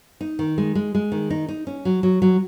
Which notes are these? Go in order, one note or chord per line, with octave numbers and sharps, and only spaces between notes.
D#4
D#3
G#3
G#3
G#3
D#3
D#4
D#4
C#4
F#3
F#3
F#3